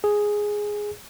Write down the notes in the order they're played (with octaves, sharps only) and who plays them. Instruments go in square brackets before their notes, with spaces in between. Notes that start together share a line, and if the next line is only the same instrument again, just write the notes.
[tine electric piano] G#4